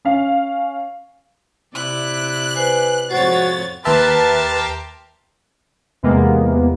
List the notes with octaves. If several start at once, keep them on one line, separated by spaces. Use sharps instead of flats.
C#4 F5
C3 E4 D5 F#6
B4 C5 G#5
F2 G#2 F#4 C5 C#5 A6
D#2 G4 A#4 B4 E5 A5 C6
E2 C3 E3 G#3 A#3 B3